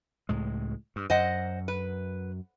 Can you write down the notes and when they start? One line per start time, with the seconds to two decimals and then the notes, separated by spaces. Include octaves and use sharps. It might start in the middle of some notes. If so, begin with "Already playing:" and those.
0.29 C#2 A2 G#3
0.96 G2
1.10 F#2 C5 D#5 F#5
1.68 B4